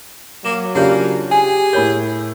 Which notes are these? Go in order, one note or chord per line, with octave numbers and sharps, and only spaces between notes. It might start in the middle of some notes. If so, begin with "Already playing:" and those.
F#3 A#3 D6 E7
C#3 A#3 D4 F4 G4 G6
G4 G#4 G#5
A2 A#4 C#5 B5 G6